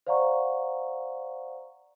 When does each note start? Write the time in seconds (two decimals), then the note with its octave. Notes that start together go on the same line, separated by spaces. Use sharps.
0.07 C5 D5 F5 F#5 A#5 C#6